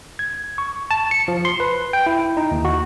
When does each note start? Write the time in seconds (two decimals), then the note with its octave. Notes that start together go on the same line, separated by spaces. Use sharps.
0.19 G#6
0.58 C#6
0.91 A5
1.11 C#7
1.28 F3
1.45 C6
1.60 B4
1.93 G5
2.06 E4
2.37 D#4
2.51 D#2
2.65 F#4